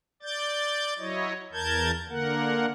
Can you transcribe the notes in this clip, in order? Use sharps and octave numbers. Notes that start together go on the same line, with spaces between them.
D5 G6 A6
F#3 E4 C#5 D#5
E2 A#4 A5 G6 G#6
D3 A#3 A#4 F#5